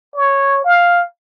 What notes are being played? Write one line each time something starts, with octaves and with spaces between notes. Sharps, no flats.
C#5
F5